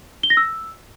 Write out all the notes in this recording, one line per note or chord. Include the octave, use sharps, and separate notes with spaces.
G7
A#6
E6